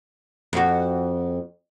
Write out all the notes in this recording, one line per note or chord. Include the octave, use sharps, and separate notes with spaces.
F2 F#4